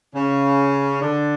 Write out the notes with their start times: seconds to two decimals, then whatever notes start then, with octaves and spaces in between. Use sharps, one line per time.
0.14 C#3 C#4
1.01 D3 D4